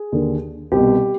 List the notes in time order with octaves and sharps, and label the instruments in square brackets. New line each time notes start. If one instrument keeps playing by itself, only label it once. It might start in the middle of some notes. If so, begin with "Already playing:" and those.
Already playing: [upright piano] G#4
D#2 D3
C2 G4
B2